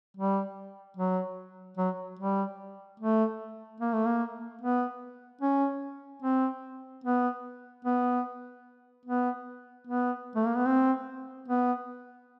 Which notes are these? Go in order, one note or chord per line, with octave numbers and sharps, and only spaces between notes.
G3
F#3
F#3
G3
A3
A#3
A3
A#3
B3
C#4
C4
B3
B3
B3
B3
A3
A#3
B3
C4
B3